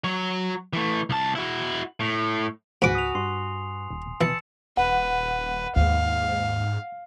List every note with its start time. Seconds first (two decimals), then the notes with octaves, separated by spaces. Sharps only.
0.04 F#3 C#5
0.73 E3 A3
1.10 C2 A5
1.35 E4 F#4
2.00 A2
2.82 C#2 G#2 F#4 B4 G#5 D6
2.95 D#6 F7
3.15 G2 C6 C7
3.90 D#1
4.21 B2 E3 A5 E6 C#7 F#7
4.77 D#1 B4 F#5
5.76 D#2 G#2 F5